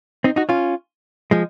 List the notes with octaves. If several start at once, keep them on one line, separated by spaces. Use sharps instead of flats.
C4 D#4
D#4 F#4
C#4 F4
F3 G#3